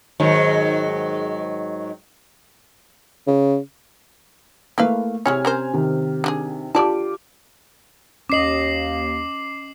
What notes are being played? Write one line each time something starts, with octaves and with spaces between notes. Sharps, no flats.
G#2 D#3 F#3
C#3
A3 A#3 E4 B4 F5
C3 G#3 E4 C#5 G#5 F6
C#4 A#4 C5
C3 D#3
D4 F#4 G#4
D3 F4 G4 D5 A5 D6
D#2 C#4 D#5 D6 C7 F#7